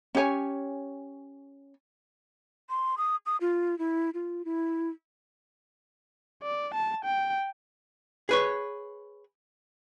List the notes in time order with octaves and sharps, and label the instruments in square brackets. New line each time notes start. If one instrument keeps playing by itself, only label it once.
[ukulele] C#4 G4 C#5 G#5
[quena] C6
D#6
D#6
F4
E4
F4
E4
[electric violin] D5
A5
G5
[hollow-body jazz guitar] G#4 B4 C#5